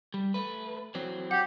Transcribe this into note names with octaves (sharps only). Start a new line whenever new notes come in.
G3
A3 B4
E3 F#3 C4
F#3 G4 F#5